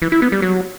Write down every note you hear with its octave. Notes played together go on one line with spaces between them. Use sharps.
E3
E4
B3
G3
F#3